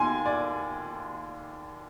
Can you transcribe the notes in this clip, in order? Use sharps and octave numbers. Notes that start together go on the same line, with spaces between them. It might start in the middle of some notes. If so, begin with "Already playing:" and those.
Already playing: D#2 D#3 G3 G#5 C6
D5